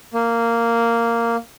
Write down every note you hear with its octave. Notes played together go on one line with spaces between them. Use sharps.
A#3